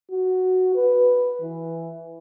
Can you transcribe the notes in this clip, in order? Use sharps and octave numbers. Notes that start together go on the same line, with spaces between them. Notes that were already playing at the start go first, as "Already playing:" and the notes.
F#4
B4
E3